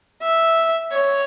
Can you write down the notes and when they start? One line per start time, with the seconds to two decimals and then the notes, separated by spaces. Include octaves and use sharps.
0.22 E5
0.92 C#5